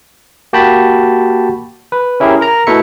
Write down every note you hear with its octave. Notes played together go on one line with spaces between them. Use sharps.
A#3 F#4 G4 G5 A5 B5
B4
C#4 E4 G4 G#4 A#4
A#4 A#5
B2 A3 E4 E5 C#7